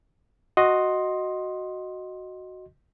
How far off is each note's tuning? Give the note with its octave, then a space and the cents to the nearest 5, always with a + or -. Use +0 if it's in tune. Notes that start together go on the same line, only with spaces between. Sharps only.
F#4 +0 D#5 +0 C6 +10